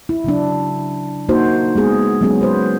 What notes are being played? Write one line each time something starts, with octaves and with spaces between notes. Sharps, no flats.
E4
C#3 F#3 D4
A#3 D#4 F#4 C5
G#3 B3 G#4
F#3 G#3 B3 C#4 G#4
B4 C5